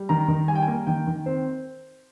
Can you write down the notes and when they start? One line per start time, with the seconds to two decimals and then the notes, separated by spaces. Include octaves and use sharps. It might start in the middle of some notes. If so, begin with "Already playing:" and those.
Already playing: G3
0.09 D#3 A#5
0.28 D#3
0.48 G3 G#5
0.55 G5
0.62 G#5
0.68 A#3
0.87 D#3 G5
1.07 D#3
1.26 C4 C5